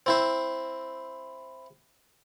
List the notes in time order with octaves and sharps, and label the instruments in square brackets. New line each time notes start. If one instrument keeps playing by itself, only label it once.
[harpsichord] C4 E4 C5